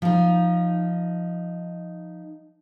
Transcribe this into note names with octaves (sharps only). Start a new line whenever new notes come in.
F3 D#4